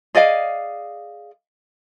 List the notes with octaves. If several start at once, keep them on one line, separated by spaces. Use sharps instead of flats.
G#4 D5 D#5 F5